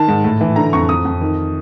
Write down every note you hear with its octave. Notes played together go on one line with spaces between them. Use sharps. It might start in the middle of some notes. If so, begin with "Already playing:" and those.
Already playing: D#3 A5
G#2
A2
E3
D3 A#5
F2 C#6
F2 D#6
F2
D#3